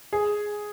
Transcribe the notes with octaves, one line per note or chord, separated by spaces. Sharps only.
G#4